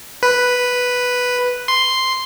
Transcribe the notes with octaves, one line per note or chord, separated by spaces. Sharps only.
B4
C6